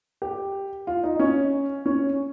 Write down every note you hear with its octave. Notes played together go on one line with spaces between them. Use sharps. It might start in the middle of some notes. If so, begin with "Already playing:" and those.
G4
F4
D#4
C#4
C#4